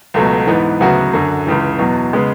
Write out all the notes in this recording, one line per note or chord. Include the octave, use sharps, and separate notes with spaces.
C#2 B2 F#3 A3
G#2 E3 B3
D2 C#3 F#3 B3 F#4
F#2 D3 F#3
C#2 C#3 E3
E2 B2 F#3
C#3 G#3 B3